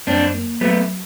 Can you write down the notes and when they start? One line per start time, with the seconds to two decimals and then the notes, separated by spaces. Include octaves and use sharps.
0.07 F#2 C4 D4
0.34 A#3
0.61 F#3 A3 B3